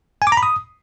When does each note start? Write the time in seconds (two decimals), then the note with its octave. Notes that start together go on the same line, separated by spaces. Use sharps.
0.22 G#5
0.27 D6
0.32 A#5
0.37 B5
0.43 D#6